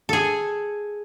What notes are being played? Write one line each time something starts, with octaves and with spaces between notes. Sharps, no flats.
G#4 A4